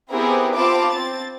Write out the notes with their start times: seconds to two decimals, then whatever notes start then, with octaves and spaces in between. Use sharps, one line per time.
0.11 B3 C4 E4 G4 G#4 A#4
0.55 C4 F4 A5 B5 D6
0.91 C4 A6